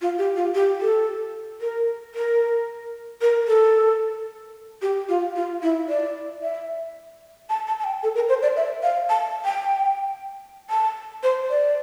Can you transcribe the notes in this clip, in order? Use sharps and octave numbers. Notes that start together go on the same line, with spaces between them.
F4
G4
F4
G4
A4
A#4
A#4
A#4
A4
G4
F4
F4
E4
D5
E5
A5
A5
A5
G5
A4
A#4
C5
D5
E5
F5
A5
G5
A5
C5
D5